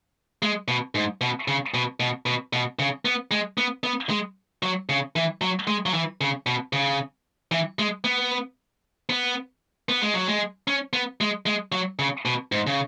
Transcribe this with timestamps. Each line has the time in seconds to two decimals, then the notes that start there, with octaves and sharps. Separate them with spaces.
0.43 G#3
0.68 B2
0.95 G#2
1.21 B2
1.48 C#3
1.74 B2
2.00 B2
2.26 B2
2.53 B2
2.79 C#3
3.05 B3
3.31 G#3
3.58 B3
3.84 B3
4.10 G#3
4.63 F#3
4.89 C#3
5.16 E3
5.42 F#3
5.67 G#3
5.86 F#3
5.94 E3
6.21 C#3
6.46 B2
6.73 C#3
7.51 E3
7.79 G#3
8.04 B3
9.10 B3
9.89 B3
10.02 G#3
10.14 F#3
10.27 G#3
10.68 C#4
10.93 B3
11.21 G#3
11.46 G#3
11.72 F#3
11.99 C#3
12.25 B2
12.52 G#2
12.67 C#3